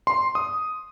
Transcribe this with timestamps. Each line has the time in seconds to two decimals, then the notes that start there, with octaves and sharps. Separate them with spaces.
0.07 C6
0.35 D#6